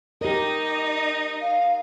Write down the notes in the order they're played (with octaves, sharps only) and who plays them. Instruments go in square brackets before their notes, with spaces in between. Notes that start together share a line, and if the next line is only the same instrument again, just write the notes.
[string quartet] D#4 D#5 [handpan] G4 A#4
[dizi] F5